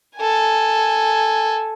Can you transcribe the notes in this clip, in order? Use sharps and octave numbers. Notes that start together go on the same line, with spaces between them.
A4 G#5